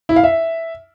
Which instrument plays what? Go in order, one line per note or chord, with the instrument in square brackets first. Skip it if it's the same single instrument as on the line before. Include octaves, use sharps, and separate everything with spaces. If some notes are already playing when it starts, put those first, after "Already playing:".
[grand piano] E4
F5
E5